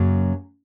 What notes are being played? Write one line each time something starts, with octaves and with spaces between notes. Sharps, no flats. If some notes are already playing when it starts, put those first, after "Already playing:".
Already playing: F#2 C#3 F#3 A#3